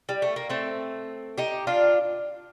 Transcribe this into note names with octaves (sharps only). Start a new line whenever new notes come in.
G3
A3
A#3
A3 C4
D#4 G4
D4 F4